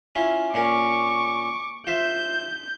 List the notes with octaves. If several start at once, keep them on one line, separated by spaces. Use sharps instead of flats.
C#4 E4 F4
A#2 C#4 A#4 C#6 D6
F4 C5 E5 G6